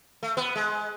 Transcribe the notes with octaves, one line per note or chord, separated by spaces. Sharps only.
A3
B3
G#3